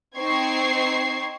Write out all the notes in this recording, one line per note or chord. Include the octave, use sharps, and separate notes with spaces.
C4 D#4 C#6 G#6 C7